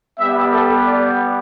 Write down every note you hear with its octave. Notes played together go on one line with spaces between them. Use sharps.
G3 B3 G4 E5
A4
D5